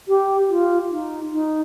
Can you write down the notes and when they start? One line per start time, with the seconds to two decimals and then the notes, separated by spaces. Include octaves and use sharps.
0.08 G4
0.49 F4
0.91 D#4
1.32 D#4